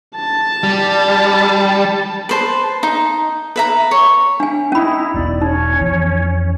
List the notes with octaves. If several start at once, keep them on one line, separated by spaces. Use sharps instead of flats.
A5
G3
B4 C5 A5
D#4
B4 E5 A#5
C#5
D4 G#5
C#4 D#4 E4 B5
E1 B1 B2 D5
C#4 D#4 C#5
F2 E3